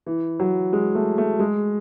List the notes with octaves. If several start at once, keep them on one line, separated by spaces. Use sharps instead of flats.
E3
F#3
G#3
A3
A3
G#3